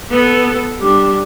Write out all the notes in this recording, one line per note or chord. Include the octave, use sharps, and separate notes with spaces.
B3 A4
G3 D4